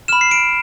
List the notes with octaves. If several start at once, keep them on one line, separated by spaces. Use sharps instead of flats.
B5 F6 E7
C7
D7